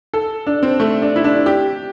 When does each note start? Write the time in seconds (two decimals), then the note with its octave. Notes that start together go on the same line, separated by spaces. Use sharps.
0.14 A4
0.47 D4
0.63 C4
0.80 A3
1.02 D4
1.16 E4
1.24 D4
1.46 G4